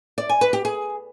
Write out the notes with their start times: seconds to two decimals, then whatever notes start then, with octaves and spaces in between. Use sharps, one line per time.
0.18 D5
0.29 G#5
0.41 B4
0.53 G4
0.65 G#4